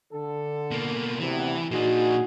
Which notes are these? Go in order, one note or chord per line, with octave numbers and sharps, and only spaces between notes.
D3 A4
B2 A#3
D2 C3 E3 B3
A#2 D4 D#4 F#4 G#4